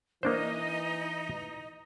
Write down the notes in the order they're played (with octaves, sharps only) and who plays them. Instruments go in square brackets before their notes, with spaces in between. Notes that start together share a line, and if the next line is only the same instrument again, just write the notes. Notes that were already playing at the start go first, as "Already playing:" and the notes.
[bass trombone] E3 [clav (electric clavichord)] A#3 D4 C5 [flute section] D#4 D#5